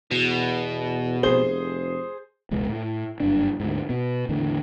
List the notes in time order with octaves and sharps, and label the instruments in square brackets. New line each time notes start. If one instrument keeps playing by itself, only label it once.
[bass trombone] E2 [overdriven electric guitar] B2
[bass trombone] F1 [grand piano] G#4 C5 G7
[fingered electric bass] E1 C#2 G#3 B3
A2
F#1 G2 D4
D2 G#2
B2 B3
E2 A2 D3 D#3